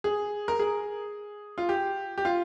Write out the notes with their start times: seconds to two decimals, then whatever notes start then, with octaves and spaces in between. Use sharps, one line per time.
0.04 G#4
0.48 A#4
0.60 G#4
1.58 F4
1.69 G4
2.18 G4
2.25 F4